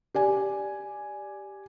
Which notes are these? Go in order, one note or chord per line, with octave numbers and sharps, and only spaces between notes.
G4 D5 G#5